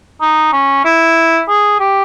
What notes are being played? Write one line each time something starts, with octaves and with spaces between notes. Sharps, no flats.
D#4
C#4
E4
G#4
G4